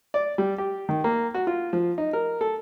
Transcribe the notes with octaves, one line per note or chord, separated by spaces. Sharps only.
D5
G3
G4
D#3
A#3
F#4
F4
F3
D#4
A#4
A4